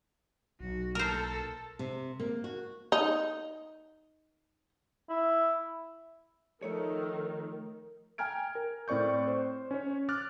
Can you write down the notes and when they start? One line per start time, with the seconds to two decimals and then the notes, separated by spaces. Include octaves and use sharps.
0.61 B1 F#4
0.95 A#3 A4 A#4 C5
1.79 C3
2.20 A#3
2.44 F#4
2.92 D#4
5.09 E4
6.62 D#3 F3 A3 A4 C#5
8.18 G5 G#5 A#5 F6 G#6 D7
8.55 A#4
8.88 A2 C4 D5 C#6 G6
9.27 C5
9.71 C#4 C#5
10.09 D6 F6 F#6 A6